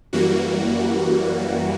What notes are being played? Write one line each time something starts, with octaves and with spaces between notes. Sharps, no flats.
F#2 E3 G3 A#3 F#4